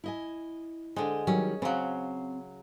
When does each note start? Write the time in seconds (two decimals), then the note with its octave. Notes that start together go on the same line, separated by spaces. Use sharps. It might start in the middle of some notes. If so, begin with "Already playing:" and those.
0.04 E4 D#5 G#5
0.96 D3 G#3 C5
1.27 D#3 F#3 G3 C#4
1.62 C#3 F#3 C4 F5